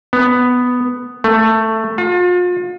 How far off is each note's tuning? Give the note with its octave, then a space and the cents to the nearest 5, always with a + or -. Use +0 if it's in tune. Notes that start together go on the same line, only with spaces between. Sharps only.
B3 +5
A3 +10
F4 +40